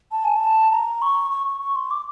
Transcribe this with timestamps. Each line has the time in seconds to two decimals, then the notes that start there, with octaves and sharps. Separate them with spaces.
0.12 A5
0.24 G#5
0.36 A5
0.72 A#5
1.02 C#6
1.31 C#6
1.46 C#6
1.61 C#6
1.76 C6
1.91 D6